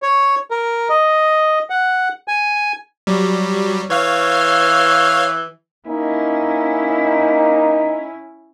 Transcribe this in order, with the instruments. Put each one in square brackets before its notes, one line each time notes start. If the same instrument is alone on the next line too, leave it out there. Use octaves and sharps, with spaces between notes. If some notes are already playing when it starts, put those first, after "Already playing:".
[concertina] C#5
A#4
D#5
F#5
G#5
[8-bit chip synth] F#3 G3
[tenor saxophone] E3 [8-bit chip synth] C#5 F5 F6
[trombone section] A#3 D#4 [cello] C#4 E4